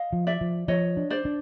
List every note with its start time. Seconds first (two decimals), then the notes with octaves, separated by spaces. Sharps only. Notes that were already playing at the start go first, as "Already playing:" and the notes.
Already playing: D#5 F5
0.13 F3
0.27 D5 E5
0.41 F3
0.68 F3 C#5 D#5
0.97 D4
1.10 C5 D5
1.25 D4